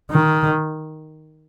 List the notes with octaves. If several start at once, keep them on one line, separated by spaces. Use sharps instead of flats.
D#3